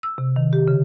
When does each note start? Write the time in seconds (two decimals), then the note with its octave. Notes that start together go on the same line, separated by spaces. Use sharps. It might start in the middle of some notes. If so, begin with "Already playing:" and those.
0.03 E6
0.18 C3
0.36 D#3
0.53 G4
0.68 C#3